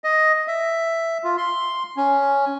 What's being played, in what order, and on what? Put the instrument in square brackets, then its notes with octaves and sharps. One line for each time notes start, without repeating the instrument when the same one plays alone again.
[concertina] D#5
E5
F4
C6
C#4